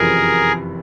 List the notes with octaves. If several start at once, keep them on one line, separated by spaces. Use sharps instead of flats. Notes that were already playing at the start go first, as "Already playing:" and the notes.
Already playing: F#1 F2 C3 E3 G#4 A#4